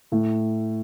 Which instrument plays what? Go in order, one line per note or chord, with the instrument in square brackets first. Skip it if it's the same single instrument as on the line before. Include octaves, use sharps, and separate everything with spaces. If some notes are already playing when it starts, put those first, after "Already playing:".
[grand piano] A2